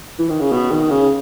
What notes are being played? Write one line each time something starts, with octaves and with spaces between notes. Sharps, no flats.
E3
D#3
C#3
B2
D#3
C#3